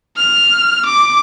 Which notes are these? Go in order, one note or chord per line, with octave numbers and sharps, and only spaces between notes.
F6
D6